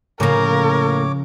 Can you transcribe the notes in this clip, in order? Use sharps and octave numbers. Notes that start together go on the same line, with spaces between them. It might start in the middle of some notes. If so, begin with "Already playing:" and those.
A2 C#3 F3 A#3 A#4 C#5 D6